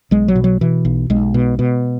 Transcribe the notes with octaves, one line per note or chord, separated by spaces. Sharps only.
B1 G#3
F#3
B2
F#3
B2 E3
B1
B1 G#3
B2
B2